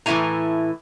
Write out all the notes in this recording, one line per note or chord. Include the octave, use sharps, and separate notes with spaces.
A2 E3 A3 E4 G#5 A#5